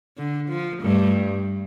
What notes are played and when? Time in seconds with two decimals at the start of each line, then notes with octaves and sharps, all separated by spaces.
0.17 D3
0.50 F3
0.82 G2 A3